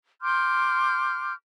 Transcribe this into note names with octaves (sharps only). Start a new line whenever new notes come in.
C6 D6 F6 G6